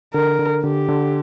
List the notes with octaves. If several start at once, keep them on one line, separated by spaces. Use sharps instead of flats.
D3 A#4
D3
D3 G4
D3